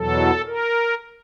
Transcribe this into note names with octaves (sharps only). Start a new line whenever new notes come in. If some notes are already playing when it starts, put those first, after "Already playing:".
Already playing: E2 B2 F#3 A4
A#4